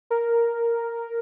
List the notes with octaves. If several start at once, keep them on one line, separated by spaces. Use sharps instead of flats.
A#4